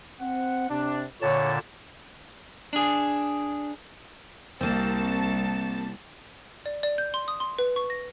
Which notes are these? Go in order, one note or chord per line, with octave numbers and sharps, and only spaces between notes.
C4 F#5
C3 D4
A#2 D3 C#5 A5
D4 G#4
C2 A#3 C4 A5
D5
D5
G6
C6
D#6
C6
B4
C#6
A#6